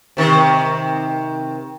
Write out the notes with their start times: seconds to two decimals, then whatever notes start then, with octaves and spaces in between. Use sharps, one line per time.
0.17 C3 D#3